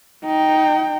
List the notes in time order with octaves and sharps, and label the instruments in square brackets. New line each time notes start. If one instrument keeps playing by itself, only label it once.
[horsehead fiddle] D#4 G5